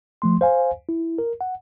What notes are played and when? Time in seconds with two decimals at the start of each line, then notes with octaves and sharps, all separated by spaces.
0.22 F3 A3 C6
0.41 C5 F5 G#5
0.89 E4
1.18 A#4
1.41 F#5